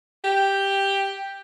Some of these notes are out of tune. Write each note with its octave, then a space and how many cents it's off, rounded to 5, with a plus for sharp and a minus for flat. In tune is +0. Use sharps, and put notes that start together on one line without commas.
G4 +5